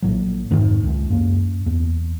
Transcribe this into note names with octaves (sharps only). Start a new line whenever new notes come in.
A#1 A2 F#3
F2 G#2 D#3 A3
C#2
F#2 A#3
E2